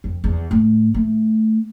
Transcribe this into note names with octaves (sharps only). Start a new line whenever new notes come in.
F2
E2
A2
A3